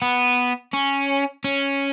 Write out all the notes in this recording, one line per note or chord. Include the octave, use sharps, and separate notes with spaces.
B3
C#4
C#4